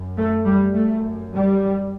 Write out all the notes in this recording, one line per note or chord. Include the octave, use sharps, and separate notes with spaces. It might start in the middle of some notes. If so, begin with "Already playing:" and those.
Already playing: F#2
A3
G3
F#2 A3
G3